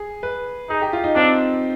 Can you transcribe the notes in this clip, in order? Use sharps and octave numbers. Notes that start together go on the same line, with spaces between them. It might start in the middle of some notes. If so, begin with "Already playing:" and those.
Already playing: G#4
B4
D#4 G#4
G4
F4
D#4
C4 D4